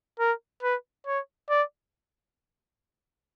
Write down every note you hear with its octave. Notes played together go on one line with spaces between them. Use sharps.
A#4
B4
C#5
D5